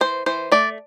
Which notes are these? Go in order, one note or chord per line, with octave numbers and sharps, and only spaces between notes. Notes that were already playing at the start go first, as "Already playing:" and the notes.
E3 C5
E3 C5
A3 D5